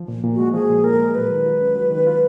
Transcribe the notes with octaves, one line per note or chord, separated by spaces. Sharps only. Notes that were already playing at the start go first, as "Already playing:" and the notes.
Already playing: F3
A#2
A#2
G#3 F#4
F3 G#4
A#2
A#2 A#4
G#3
F#3 B4
D#3
F4
C#4
F#3
D#3
F4